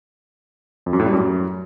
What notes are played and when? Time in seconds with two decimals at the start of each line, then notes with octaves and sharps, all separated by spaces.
0.86 F2
0.93 F#2
1.00 A2
1.06 G3
1.13 F#2